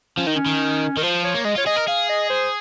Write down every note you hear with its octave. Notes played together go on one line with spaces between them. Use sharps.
F3 C#4
D#3 D#4
C#4
D#3
D#3 A#4
F3 C5
C#5
A#3
G#3 D#5
F4 C#5
G#4 D#5
A#4
G#4 F5
D#5
C5